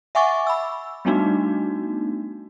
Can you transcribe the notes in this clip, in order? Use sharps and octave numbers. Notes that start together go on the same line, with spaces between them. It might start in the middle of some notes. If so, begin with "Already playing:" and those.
E5 F#5 G#5 C#6 D6 A6
B5 E6
G3 A3 B3 D4 D#4 F#4